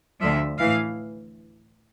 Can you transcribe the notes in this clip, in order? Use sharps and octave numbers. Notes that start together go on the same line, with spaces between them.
D2 D3 F3 E5
A2 E3 F5